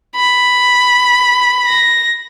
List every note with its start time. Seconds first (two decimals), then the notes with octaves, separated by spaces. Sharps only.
0.16 B5
1.67 A#6